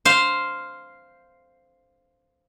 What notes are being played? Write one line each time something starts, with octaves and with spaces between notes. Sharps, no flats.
C5 F5